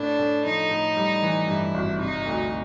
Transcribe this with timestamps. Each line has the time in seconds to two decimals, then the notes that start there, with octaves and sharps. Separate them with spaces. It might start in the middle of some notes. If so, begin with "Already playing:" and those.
Already playing: A2 D4
0.19 A2
0.45 F3 D#4
0.71 A2
0.96 G3
1.23 E3
1.48 G2 E4
1.74 G#1
2.00 C3 D#4
2.25 D2